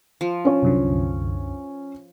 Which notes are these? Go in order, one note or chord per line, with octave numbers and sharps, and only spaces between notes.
F3
C#4 C#5
C2 F#2 D3